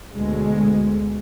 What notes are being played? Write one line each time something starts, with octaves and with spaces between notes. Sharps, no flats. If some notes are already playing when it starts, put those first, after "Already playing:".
D2 B2 G#3